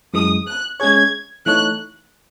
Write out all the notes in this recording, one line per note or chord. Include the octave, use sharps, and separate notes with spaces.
F#2 E3 G#3 D#6
F#6
G#3 C#4 G#4 C#5 G#6
E3 A3 D#4 A4 C#5 F#6